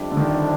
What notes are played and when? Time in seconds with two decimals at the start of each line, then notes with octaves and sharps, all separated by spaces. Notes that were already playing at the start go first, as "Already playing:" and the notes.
Already playing: F2 C3 G3 D4
0.12 D3
0.17 D#3